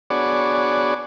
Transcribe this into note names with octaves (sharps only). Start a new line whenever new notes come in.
B3 D4 F#4 G#4 C#5 D5